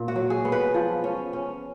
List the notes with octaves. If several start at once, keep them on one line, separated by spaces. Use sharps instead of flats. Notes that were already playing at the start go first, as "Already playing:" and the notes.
Already playing: A#2
F#4
F#3
G#4
B3
B4
F3
C#4
C#4